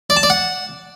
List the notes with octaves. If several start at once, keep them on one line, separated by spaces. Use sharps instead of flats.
D5
A5
D5
F#5